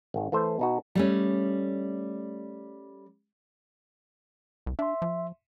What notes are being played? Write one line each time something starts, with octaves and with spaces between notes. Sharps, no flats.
G#1 D#3
E3 A3 C5
B2 D#4 F#4
G3 A3 C#4
C2
D4 E5 C6
F3